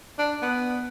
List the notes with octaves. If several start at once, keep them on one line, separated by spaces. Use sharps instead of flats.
D4
B3